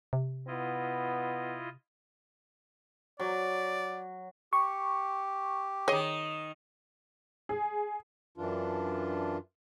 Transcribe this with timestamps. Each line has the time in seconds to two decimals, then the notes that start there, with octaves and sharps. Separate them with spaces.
0.13 C3
0.47 B3 E4 F4 D#5
3.20 F#3 D5
4.53 G4 C#6
5.88 D#3 G#4 C#5 D#5
7.49 G#4
8.37 F#2 E3 D4 F4